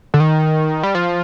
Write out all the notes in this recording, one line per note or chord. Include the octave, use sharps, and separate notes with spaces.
D3
D#3
G3
F3